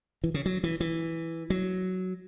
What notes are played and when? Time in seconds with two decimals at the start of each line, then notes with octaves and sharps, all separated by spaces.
0.24 E3
0.34 C#3
0.46 F#3
0.64 E3
0.80 E3
1.50 F#3